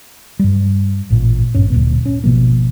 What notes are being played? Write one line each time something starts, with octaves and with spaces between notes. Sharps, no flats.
G2 G3
A1 A#2
G#1 G2 C#4
D1 A#2 B3
C#4
G#1 B2 F3 A#3